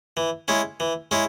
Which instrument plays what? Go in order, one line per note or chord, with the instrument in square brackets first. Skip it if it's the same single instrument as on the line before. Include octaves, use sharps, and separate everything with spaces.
[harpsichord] E3
G#3 C#4 E4
E3
G#3 C#4 E4